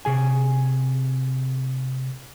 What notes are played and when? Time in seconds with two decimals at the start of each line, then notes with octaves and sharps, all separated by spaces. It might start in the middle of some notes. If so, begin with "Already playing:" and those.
0.05 C3 G#4 G#5